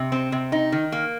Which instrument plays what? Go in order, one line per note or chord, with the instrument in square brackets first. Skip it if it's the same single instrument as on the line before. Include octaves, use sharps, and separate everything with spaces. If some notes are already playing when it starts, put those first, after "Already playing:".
Already playing: [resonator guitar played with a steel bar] C3
C4
C3
D#4
D#3
A#3